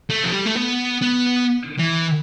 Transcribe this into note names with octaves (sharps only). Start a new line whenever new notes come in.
A3
F3
G3
A3
B3
B3
E3